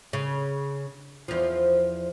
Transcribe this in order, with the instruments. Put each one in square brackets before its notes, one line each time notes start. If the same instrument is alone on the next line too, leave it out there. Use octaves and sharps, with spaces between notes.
[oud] C#3
E2 F3